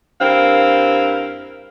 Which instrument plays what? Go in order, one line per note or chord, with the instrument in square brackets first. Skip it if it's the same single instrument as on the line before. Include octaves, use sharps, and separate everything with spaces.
[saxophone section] G2 C4 E4 A#4 F5